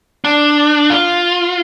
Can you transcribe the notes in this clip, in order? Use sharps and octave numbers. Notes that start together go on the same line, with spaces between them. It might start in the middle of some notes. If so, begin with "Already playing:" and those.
D4
F4